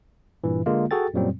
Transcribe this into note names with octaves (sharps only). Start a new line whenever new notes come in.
G2 A#2 E3
D3 G#3 A#3 F4
F#4 G#4 A4 G5 A6
F#2 A#2 F#3 G3 C4